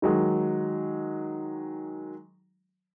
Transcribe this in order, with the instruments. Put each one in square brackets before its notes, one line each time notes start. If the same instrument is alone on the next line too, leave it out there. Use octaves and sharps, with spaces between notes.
[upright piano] D#3 F#3 G#3